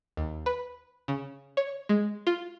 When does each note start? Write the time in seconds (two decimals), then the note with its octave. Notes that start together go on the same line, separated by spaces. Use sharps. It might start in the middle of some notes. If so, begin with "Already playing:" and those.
0.17 D#2
0.46 B4
1.08 C#3
1.57 C#5
1.89 G#3
2.27 F4